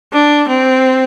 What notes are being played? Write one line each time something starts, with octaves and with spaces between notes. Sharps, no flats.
D4
C4